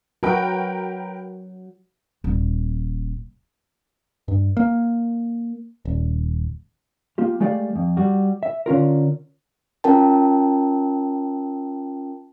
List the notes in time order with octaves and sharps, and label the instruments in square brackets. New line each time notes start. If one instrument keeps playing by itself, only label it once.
[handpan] F#3 F#4 [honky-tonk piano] A#4 B4 G5
[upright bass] D#1
[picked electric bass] G2
A#3
D#1
[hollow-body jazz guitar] A#3 F4 G4
G#3 A3 G4 D5 F5
F2
G3 F#4
E5
D3 C#4 F4 A#4
[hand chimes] C#4 F4 A#4 G5 A5